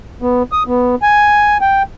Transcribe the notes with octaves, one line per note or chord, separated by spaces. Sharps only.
B3
D#6
B3
G#5
G5